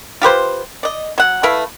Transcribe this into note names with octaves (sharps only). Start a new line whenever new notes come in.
F4 G4 B4 C5
D5 D#5
F#3 F#5
A3 E4 B4 F5